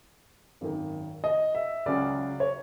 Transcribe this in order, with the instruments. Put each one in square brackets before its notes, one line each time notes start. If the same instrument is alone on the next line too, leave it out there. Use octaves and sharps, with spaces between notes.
[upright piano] G#1 F#2 D#3
D#5
E5
C#2 C#3 F#3 D5
C#5